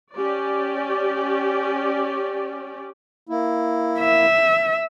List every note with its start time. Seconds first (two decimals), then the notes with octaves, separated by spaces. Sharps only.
0.15 C#4 G4 D5
3.29 A#3 E4
3.99 E5